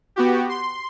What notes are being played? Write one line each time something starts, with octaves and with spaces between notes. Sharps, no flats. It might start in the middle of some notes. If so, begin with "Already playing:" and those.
B3 F#4 G4
C6